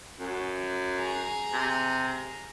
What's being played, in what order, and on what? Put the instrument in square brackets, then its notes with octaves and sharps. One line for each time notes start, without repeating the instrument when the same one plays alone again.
[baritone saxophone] F#2
[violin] G#4 A#5
[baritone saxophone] C3